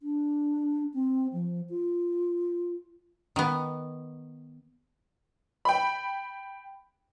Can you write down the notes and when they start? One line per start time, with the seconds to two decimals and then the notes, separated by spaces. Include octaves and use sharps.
0.02 D4
0.94 C4
1.33 F3
1.70 F4
3.36 D#3 B3
5.65 G5 B5